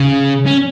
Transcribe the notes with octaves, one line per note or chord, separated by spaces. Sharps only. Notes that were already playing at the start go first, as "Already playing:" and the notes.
Already playing: C#3
C#4